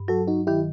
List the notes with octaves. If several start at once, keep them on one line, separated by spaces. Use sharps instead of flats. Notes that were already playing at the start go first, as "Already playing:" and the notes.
Already playing: G2
F#3 F#4 A4
D#4 F#4
D#3 E4 G4